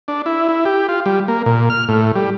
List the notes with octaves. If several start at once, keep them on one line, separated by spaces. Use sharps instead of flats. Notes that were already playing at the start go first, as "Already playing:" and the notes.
D4
E4
E4
G4
F4
G3
A#3
A#2
F6
A2
G3